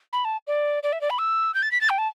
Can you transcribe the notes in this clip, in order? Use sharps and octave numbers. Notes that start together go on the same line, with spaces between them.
B5
A5
D5
D5
E5
D5
B5
E6
G6
A6
B6
A6
G5
A5